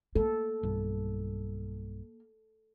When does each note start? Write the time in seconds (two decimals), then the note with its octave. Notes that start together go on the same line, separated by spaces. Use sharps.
0.16 A#3 A4
0.63 B1 G2